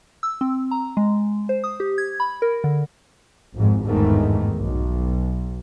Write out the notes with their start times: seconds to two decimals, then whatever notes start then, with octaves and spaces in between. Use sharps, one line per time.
0.23 E6
0.41 C4
0.71 A#5
0.97 G#3
1.49 C5
1.64 D#6
1.80 G4
1.98 G#6
2.20 B5
2.42 A#4
2.64 D3
3.56 G#1 F2 G#2
3.87 G1 E2 G#2 D#3 A3
4.57 B1